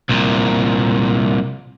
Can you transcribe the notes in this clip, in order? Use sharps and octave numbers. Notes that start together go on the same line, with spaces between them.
C2 A#2